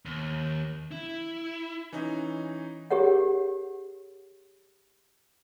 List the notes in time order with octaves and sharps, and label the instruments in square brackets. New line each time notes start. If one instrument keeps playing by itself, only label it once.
[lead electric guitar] D#2
E4
[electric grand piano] E3 C#4 D#4
[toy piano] G4 G#4 A#4 C#5 F#5